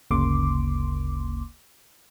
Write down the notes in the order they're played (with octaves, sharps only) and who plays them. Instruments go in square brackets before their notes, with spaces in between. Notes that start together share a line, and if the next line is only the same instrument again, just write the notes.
[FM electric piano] G1 D2 C#3 A#3 C6 D6